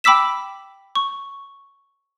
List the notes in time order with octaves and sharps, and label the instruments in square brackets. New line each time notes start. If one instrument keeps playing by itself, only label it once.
[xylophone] G5 B5 D6 E6 B6 E7
C#6